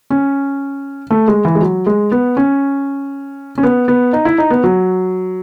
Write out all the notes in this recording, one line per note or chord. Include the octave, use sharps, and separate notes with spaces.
C#4
A3
G#3
E3
G#3
F#3
G#3
B3
C#4
C#4
B3
B3
D#4
E4
D#4
B3
F#3